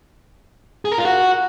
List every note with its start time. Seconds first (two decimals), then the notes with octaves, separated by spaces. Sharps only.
0.85 G#4
0.92 A#4
0.98 F4
1.05 F#4